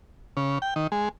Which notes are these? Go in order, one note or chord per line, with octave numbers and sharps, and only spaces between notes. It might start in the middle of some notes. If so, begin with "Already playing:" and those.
C#3
G5
D#3
G#3